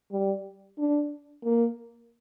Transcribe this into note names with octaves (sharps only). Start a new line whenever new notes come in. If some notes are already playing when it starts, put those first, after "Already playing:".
G3
D4
A#3